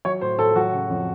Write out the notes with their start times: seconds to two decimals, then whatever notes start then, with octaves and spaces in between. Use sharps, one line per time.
0.05 F#3 C#5
0.21 A2 C5
0.39 A2 A4
0.55 F#3 F#4
0.73 C#3
0.89 F2